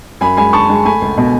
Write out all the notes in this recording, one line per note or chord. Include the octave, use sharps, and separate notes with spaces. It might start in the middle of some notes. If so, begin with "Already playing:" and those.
F#2 G#5 B5
G#3 G#5 B5
D3 A5 C#6
G#3
A3 G#5 B5
C#2
B2